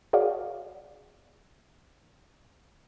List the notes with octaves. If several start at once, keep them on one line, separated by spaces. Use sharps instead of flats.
F#4 G#4 A#4 C#5 D5 F5